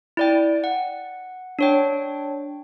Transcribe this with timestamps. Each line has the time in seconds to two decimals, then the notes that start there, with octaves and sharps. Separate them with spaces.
0.17 E4 D5 G5
0.64 F#5
1.59 D4 C#5 G5